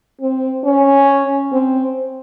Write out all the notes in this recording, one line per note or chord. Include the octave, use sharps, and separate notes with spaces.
C4
C#4
C4